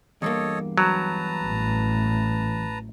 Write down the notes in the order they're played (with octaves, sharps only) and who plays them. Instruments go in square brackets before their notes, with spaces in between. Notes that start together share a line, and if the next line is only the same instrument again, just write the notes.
[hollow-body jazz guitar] E2 G2 A#3 [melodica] A4 C#5 D#5
[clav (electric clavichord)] F#3 [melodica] B4 A5 A#5
[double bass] A1 A2